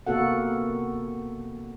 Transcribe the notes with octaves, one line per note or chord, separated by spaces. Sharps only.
C3 A#3 B3 F#4 A4 F#5